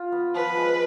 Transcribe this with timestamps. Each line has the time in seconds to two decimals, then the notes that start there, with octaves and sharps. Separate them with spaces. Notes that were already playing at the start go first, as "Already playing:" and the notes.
Already playing: F4
0.12 B3
0.35 F3 B4
0.57 G#3